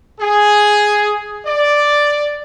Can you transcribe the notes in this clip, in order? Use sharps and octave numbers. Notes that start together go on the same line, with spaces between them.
G#4
D5